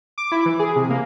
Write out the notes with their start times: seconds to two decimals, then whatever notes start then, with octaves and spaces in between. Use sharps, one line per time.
0.18 D6
0.32 E4
0.46 E3
0.59 G#4
0.76 C3
0.90 A#3